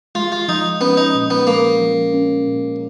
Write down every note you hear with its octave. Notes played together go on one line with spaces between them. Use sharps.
G#3 F4
F4
F3 D#4
B3 C#4
D#4
A#2
B3
G#3 A#3
F3
C#4
A#2